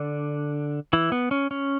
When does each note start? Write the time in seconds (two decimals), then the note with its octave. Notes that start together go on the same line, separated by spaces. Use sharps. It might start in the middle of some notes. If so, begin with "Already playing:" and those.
Already playing: D3 D4
0.93 E3 E4
1.12 B3
1.31 C#4
1.51 C#4